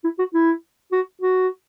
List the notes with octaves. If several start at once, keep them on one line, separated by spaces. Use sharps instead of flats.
E4
F#4
E4
F#4
F#4